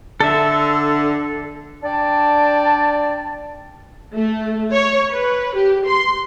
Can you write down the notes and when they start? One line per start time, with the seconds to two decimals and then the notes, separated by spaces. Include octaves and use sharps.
0.20 D3 A4 E5
1.83 D4 D5 G5 A5
4.14 A3
4.72 C#5
5.12 B4
5.56 G4
5.86 C6